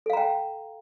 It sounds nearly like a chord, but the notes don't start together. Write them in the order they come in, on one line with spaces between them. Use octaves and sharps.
A4 F5 A#5 G5